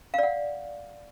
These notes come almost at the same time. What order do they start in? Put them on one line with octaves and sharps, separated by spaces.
F5 D5 F#5